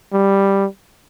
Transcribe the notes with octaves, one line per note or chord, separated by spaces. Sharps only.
G3